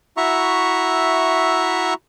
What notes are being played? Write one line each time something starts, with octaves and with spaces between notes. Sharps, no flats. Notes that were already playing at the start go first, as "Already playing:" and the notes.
E4 F#4 E5 A#5 C#6